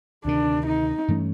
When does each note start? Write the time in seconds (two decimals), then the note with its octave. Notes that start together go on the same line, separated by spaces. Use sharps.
0.24 D2 C3 D#3 D4
0.66 D#4
1.08 G2 E3 A3 C#4